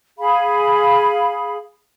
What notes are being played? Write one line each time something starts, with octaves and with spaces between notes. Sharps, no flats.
G#4 F5 B5